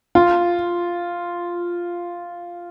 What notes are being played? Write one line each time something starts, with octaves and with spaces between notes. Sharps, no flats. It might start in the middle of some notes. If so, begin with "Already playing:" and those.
F4